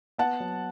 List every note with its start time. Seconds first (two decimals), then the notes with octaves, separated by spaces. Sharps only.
0.18 B3 F#5 A5
0.40 F#3